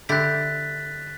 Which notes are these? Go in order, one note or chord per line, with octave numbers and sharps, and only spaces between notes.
D3 E4 G4 F#6 A6 B6